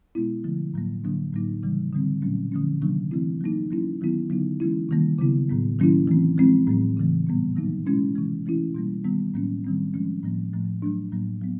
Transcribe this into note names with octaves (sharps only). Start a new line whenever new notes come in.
B2 G#3 B3 E4
D3 F3 A3
A2 F#3 A#3
D3 F#3 A#3 D4
A2 F#3 A#3 D#4
C#3 E3 G3
D3 G3 C4
A#2 F#3 A3 C#4
D3 F3 A3 C#4
C3 D#3 F#3 A#3 D4
E3 A3 C4 E4
F#3 A#3 D#4
F#3 A#3 C#4 E4
D#3 F#3 B3 E4
D3 F#3 B3 D#4
E3 G#3 C#4 E4
C3 D#3 G3 A#3
C#3 F#3 B3 E4
A2 F#3 B3
D#3 F#3 A#3 C#4 E4
E3 A3 C4
F3 G#3 C4 E4
A2 F#3 A3 C4
C#3 E3 A3
A#2 G3 B3
D#3 F#3 A#3 D#4
B2 G#3 C#4 E4
C3 E3 G#3
E3 A3 C#4 E4
B2 G3 A#3
D#3 G3 B3
A2 F#3 A#3 C#4
D#3 G3 C4
F3 G#3 C#4
A2 F3 A#3
A2 F3 A3
F#3 A3 D4
A2 F#3 A#3
F#3 B3